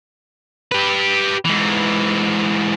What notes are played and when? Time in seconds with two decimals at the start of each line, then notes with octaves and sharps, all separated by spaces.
0.72 G4 B4
1.45 G#2 E3